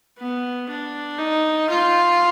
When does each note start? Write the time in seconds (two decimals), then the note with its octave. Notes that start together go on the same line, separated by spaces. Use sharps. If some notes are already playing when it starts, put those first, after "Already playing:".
0.19 B3
0.69 D4
1.18 D#4
1.69 F4